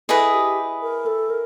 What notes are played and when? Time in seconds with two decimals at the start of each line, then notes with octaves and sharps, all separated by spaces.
0.09 E4 G#4 A4 B4 D#5
0.33 G4
0.82 A#4
1.06 A4
1.30 A#4